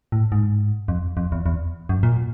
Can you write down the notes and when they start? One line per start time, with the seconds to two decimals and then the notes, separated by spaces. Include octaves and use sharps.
0.12 A2
0.32 G#2
0.88 F2
1.17 F2
1.32 E2
1.46 E2
1.89 F#2
2.03 A#2